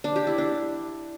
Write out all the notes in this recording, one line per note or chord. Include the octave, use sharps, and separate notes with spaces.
D4
G4
E4
D4